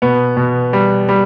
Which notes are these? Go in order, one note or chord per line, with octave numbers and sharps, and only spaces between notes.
B2 B3
B2
G3
G3